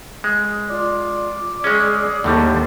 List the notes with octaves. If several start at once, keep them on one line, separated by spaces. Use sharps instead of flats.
G#3
F4 D5
G#3 C#4 G#4
D#2 A2 D3 D#3 G3 A4